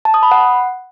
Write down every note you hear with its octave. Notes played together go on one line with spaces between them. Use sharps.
A5
D#6
B5
F#5